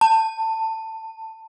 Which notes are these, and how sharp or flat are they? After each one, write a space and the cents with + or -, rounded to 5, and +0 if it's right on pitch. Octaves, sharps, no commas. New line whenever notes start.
A5 +20